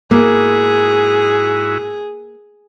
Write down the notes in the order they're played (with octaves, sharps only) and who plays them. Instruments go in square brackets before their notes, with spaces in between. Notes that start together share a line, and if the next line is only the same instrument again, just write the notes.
[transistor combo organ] G#2 E4 F#4 [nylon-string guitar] A#3 [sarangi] G#4